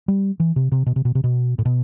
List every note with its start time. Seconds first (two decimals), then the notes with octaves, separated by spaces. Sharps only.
0.08 G3
0.40 E3
0.56 C3
0.72 C3
0.86 B2
0.96 C3
1.05 B2
1.15 C3
1.24 B2
1.58 A2
1.65 B2